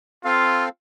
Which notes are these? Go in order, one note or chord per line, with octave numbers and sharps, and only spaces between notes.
C4 F4 A4 F5